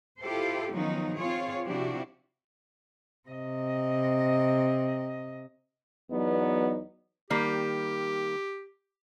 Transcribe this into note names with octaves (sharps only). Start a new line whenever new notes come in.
E4 F4 G4 A4 C5
D#3 F3 F#3 B3 C#4 D#4
C4 F4 G#4 C#5
C3 F3 D4 E4 F#4 G4
C3 D#5
E2 F#3 B3 D#4 D5
D#3 G3 A#3 G4